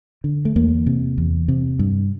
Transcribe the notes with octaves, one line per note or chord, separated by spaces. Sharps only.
D3
A3
E2 A#3
C3
E2
C3
G2